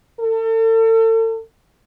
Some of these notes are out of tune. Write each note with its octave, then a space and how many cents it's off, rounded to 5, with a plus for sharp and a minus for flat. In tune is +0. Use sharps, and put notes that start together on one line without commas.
A4 +40